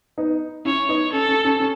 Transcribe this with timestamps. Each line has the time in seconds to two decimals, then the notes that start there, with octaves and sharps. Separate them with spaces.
0.18 B3 D#4
0.65 C#4 E4 C#5
0.89 B3 D#4
1.12 C#4 A4
1.29 C#4
1.45 C#4
1.60 C#4